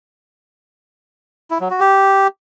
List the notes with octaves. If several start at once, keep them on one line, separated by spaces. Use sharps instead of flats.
E4
F#3
F#4
G4